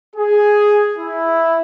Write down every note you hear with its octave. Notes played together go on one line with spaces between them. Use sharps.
G#4
E4